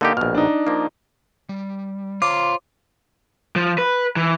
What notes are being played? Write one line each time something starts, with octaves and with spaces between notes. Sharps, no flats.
D3 A#3 D#4 G4
A#1 B2 F6
D4 D#4
F3 A#3
G3
F4 C5 C#5 A#5 D6
F3
B4
E3